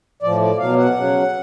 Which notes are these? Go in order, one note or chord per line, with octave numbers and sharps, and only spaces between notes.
A2 F3 D5
D5
B2 F#3 F5
F#5
C#3 F#3